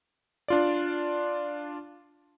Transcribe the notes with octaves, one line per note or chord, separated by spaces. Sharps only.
D4 F4 D5